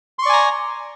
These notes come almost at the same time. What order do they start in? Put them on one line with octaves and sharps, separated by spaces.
C6 C#6 D5 G#5 A#5